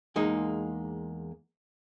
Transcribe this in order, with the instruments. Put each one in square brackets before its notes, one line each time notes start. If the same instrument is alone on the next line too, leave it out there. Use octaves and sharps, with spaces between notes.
[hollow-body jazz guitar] E2 G#3 A#3 D#4